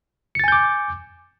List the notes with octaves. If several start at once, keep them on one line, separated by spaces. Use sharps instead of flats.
G#5 D6 G6 A6 C#7